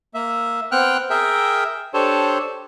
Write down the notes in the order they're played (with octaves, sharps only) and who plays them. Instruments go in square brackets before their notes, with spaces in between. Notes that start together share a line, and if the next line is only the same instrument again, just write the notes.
[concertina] A#3 E5
B3 C4 G5 F6 F#6
G#4 A#4 E5 G5
D4 G4 A4 C5 C#5